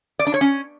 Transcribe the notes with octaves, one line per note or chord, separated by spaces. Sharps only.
D5
D4
C#5
C#4